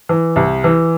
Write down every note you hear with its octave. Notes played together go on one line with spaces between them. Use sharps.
E3
C2
E3